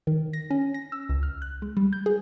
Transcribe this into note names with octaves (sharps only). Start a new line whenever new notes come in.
D#3
A#6
C#4
A#6
E6
C#2
F6
F#6
G#3
G3
G6
G#4